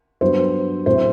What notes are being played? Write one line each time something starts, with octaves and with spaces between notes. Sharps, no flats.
G2 F#3 B3 C5
A2 F#3 A3 C4 C5